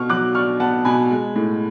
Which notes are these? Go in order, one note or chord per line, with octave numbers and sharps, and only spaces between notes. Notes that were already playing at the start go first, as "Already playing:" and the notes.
Already playing: B2 B3 C#6 F6
F#3 D6 F#6
D4 C#6 F6
B3 F#5 A5
B2 G#5 B5
G#3
A2